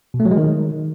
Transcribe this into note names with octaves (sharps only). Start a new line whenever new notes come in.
B2
A3
F#3
G#3
D#3